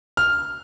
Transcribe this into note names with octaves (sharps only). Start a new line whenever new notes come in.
F6